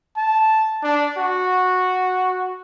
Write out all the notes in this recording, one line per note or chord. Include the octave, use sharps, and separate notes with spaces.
A5
D4
F#4